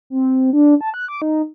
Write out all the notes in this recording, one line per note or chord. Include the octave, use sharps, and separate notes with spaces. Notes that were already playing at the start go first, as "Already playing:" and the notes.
C4
D4
A5
F#6
D6
D#4